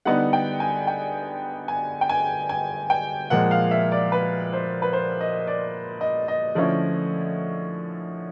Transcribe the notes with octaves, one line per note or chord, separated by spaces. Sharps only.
D3 G3 B3 D#4 F#5
G5
G#5
G5
G#5
G5
G#5
G#5
G5
A#2 F3 G#3 F#5
F5
E5
D5
B4
C5
B4
C5
D#5
D5
D#5
D#5
D3 F3 A3 C#4 E4